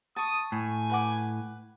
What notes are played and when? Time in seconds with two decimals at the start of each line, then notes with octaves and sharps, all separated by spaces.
0.16 A5 C#6 D#6
0.52 A2 G#5
0.90 B4 F#5 D6